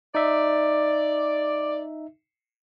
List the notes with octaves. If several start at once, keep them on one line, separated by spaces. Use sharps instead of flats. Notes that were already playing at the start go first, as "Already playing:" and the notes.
D#4 D5 E5